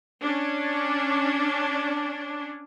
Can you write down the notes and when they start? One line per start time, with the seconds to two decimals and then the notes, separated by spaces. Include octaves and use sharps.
0.23 C#4 D4